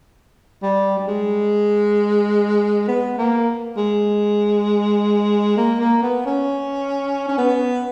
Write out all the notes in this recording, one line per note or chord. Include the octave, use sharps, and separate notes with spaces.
G3
G3
G#3
B3
A#3
G#3
A#3
A#3
B3
C#4
C#4
B3